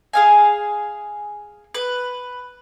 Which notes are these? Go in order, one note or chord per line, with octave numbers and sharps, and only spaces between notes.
G#4 F5 G#5
B4